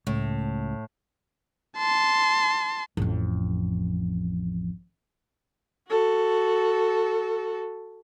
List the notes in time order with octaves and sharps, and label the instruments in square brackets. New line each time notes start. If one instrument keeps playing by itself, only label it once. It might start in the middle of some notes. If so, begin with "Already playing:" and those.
[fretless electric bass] C#2 [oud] A2
[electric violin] A5 C6
[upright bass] A1 F2
[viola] F#4 A4